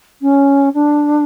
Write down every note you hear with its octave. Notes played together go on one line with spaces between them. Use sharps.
C#4
D4